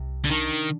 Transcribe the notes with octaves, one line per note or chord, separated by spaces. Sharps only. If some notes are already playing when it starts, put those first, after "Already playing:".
Already playing: C2 C3
D3
D#3 D4